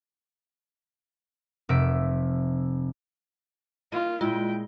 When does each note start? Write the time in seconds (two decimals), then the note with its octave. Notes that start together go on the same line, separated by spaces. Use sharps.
1.69 F1 C3 E5 D7
3.92 A#3 F4 D#5
4.21 A#2 G#3 E4 F4 G5